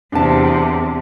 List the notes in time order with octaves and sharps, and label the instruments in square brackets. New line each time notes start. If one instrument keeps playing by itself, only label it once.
[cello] E2 C3 [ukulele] D4 A5